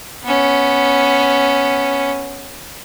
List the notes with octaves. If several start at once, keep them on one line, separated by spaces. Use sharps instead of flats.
B3 C#4